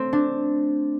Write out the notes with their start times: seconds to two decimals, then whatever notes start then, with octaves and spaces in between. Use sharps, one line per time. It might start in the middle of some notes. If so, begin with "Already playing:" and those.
Already playing: A3 C4
0.13 D4